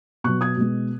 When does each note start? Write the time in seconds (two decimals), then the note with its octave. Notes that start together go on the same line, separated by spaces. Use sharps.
0.24 B2 F#3 C#6 F#6
0.41 D#6 G#6
0.57 B2 G#3